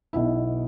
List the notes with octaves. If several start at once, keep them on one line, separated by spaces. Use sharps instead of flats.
B1 B2 B3 E4